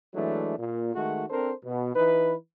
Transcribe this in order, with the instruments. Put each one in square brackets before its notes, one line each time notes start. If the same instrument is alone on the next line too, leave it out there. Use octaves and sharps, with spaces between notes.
[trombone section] E3 F#3 G#3 A3 D4
A#2
D#3 G#3 A3 F#4
C4 D4 A4 A#4 C5
B2
E3 D#4 B4